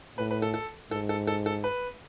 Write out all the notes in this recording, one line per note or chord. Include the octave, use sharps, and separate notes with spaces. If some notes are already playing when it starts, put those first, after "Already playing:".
A2 B4
B4
A4
A4
G#2 A4
A4
A4
A4
B4